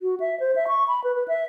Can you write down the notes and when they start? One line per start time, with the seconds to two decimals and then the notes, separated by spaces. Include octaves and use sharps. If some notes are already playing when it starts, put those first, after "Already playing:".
0.01 F#4
0.20 E5
0.40 C5
0.56 E5
0.68 C#6
0.88 B5
1.04 B4
1.16 B4
1.28 E5